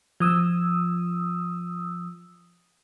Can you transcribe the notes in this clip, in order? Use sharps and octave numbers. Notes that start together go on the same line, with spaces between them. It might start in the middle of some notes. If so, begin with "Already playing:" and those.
F3 D#6 E6